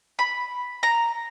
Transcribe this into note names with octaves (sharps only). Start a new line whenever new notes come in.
B5
A#5